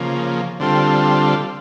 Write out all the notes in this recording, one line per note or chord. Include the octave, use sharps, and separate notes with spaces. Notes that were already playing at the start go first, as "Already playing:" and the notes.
Already playing: C#3 F3 A#3
D3 G3 C4 F4 A4